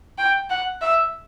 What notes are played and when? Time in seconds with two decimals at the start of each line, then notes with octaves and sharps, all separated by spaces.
0.18 G5
0.50 F#5
0.81 E5